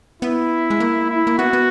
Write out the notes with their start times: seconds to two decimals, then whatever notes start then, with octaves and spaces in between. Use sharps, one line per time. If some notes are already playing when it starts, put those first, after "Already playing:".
0.22 B3 E4
0.70 G#3
0.80 A#3
1.10 E4
1.27 A#3
1.38 B3 F#4
1.53 B3